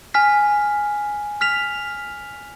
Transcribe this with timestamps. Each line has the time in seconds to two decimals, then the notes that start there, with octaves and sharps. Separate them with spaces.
0.14 G#5 F6 B6
1.41 F6 B6 F7